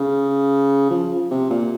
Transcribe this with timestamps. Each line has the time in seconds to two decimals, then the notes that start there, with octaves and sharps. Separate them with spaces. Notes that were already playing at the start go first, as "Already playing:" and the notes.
Already playing: C#3
0.90 F3
1.31 C3
1.50 A#2